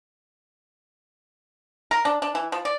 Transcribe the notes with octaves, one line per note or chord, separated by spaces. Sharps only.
A#4
D4
D4
E3
F3
D5